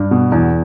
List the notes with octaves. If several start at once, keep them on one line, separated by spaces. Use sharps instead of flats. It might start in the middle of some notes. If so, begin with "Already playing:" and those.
Already playing: G2
B2
E2